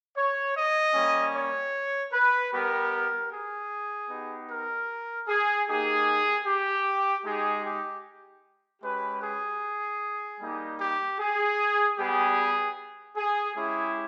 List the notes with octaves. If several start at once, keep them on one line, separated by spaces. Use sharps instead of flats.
C#5
D#5
G3 A#3 C#4
C#5
B4
G3 B3 G4 A#4
A#4
G#4
B3 D#4 G4
A#4
G#4
A#3 D#4 G4 G#4
G4
G#3 D#4 G4 G#4
G4
G#3 C#4 G4 B4
G#4
G3 A#3 D#4 G4
G4
G#4
G3 B3 G4 G#4
G#4
G#3 C#4 E4 G4 G#4